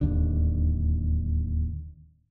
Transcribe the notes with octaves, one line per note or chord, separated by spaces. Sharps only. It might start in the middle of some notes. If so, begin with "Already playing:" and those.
D1 D#2 D3